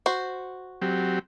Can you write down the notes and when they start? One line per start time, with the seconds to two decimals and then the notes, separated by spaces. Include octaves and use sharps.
0.06 F#4 C5
0.82 F#3 C4 G4